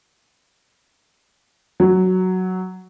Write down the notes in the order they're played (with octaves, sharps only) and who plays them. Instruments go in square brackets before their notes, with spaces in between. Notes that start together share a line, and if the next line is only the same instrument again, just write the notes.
[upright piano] F#3